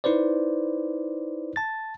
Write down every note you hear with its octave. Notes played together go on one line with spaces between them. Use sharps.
D#4 E4 B4 C5 D5
A5 A6